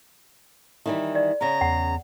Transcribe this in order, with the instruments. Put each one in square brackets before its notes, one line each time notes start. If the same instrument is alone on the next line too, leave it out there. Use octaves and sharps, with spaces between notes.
[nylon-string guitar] D#3 E3 G3
[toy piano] D5
[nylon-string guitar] C#3 B3 [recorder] A#5
[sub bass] E2 [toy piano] F#5